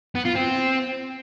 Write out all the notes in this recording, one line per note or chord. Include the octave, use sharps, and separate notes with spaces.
B3
F4
C4